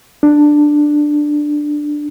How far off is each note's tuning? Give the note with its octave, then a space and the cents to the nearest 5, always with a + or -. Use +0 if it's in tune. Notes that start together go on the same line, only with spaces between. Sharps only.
D4 +10